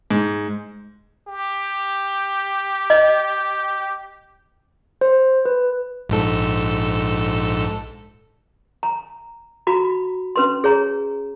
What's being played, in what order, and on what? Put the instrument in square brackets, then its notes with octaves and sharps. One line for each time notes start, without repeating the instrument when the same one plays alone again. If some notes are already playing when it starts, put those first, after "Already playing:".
[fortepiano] G#2
[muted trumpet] G4
[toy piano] D#5
[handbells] C5
B4
[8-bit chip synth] A#1 G#2 A4
[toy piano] A#5
F#4 A#5 B5
C#4 B4 C6
G#4 C#5 A#5